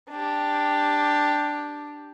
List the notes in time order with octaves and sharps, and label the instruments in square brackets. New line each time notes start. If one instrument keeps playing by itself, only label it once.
[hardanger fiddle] D4 G4